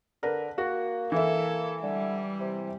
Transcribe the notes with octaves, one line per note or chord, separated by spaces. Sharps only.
D3 A#4 B4
A#3 F#4
E3 E4 A4
D3 G3
C3